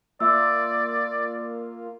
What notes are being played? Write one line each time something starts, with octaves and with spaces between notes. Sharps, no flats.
A#3 F4 D5 E5 E6